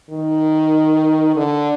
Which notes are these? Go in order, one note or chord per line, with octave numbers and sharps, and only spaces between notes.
D#3
D3